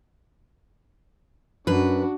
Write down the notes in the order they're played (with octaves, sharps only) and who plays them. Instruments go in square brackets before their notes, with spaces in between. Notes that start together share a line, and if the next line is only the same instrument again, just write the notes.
[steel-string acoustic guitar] F#2 B4 [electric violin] D4 F#4